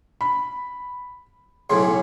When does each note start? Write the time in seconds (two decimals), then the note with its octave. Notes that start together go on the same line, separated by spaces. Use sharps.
0.21 B5
1.70 B1 A2 C#3 C6